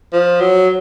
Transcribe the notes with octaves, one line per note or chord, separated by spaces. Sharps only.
F3
F#3